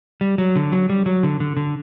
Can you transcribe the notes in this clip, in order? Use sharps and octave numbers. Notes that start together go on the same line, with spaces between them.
G3
F#3
D3
F#3
G3
F#3
D3
D3
D3